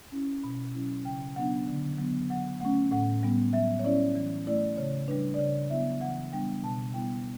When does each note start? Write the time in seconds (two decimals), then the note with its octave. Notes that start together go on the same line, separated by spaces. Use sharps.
0.12 C#4 E4
0.43 B2 B5
0.75 F#3 C#4 E4
1.05 C#3 G5
1.36 F#3 B3 D4 F#5
1.67 D3
1.99 F#3 B3
2.30 F#3 F#5
2.60 A3 C#4 F#5
2.91 A2 F#5
3.23 G3 B3
3.53 F#3 E5
3.79 C#5
3.84 C#4 E4 D5
4.16 E3
4.47 A3 E4 D5
4.77 C#3 C#5
5.08 G3 D4 B4
5.34 D5
5.39 C#3 C#5
5.70 F#3 B3 E4 E5
6.01 E3 F#5
6.33 G3 B3 D4 G5
6.63 B2 A5
6.94 G3 B3 E4 G5